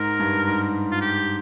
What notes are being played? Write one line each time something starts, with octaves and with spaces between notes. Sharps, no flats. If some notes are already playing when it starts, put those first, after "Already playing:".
Already playing: G#2 A#4
G2
G#2
F4
G4